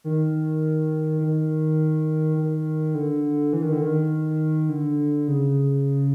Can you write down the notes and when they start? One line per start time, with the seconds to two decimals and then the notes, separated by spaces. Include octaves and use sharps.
0.04 D#3
1.21 D#3
2.37 D#3
2.95 D3
3.53 E3
3.63 D#3
3.72 D3
3.82 D#3
4.69 D3
5.28 C#3